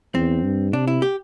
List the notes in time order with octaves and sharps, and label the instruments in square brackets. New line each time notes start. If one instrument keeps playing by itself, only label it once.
[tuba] E2 [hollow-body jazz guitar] C4
[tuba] G2
[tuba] C3 [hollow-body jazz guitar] D4
[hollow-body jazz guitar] E4
G4